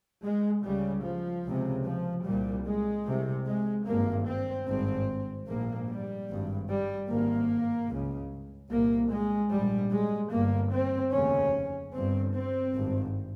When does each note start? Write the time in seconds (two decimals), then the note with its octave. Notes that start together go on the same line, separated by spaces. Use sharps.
0.24 G#3
0.64 C#2 C#3 G3
1.04 F3
1.44 C#2 C3
1.85 F3
2.25 C2 A#2 G3
2.65 G#3
3.06 C2 C3
3.46 G#3
3.86 G#1 G2 A#3
4.26 C4
4.67 G#1 G2 C4
5.47 A#1 G#2 A#3
5.88 G3
6.29 G#1 G2
6.69 G3
7.09 G#1 G2 A#3
7.89 C#2 C#3
8.71 C2 A#2 A#3
9.10 G#3
9.51 A#1 G#2 G3
9.92 G#3
10.32 G1 G2 A#3
10.72 C4
11.12 F1 D#2 C#3 C#4
11.93 G1 G2 C4
12.33 C4
12.73 G#1 G2